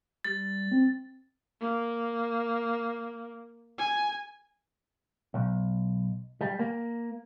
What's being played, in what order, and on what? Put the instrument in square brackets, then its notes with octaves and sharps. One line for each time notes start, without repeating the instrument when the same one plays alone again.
[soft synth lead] G3 [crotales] A6
[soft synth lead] C4
[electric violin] A#3
G#5
[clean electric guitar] B1
G3
A#3